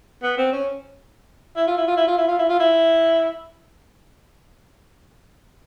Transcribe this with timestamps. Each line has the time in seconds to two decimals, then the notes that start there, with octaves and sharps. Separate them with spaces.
0.22 B3
0.38 C4
0.52 C#4
1.56 E4
1.67 F4
1.77 E4
1.87 F4
1.97 E4
2.07 F4
2.17 E4
2.28 F4
2.39 E4
2.49 F4
2.59 E4